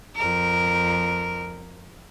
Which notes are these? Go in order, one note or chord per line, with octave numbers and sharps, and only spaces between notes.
F2 A#4